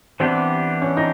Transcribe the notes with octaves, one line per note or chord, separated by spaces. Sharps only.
E3 G3 B3 C4 D4 G4
C#4
D#4